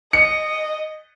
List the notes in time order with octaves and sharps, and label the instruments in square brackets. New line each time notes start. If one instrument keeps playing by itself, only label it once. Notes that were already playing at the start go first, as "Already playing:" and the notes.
[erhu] D#5 [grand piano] C#7